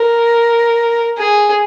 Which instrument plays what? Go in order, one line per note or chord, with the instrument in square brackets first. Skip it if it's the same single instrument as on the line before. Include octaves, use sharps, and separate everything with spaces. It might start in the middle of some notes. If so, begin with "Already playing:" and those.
Already playing: [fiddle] A#4
G#4